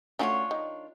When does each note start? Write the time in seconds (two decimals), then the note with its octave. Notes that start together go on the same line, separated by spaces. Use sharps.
0.19 A3 C#4 D4 F4 F#4 C#5
0.51 D#3